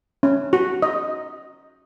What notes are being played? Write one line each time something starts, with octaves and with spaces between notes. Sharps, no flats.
C#4
F#4
D#5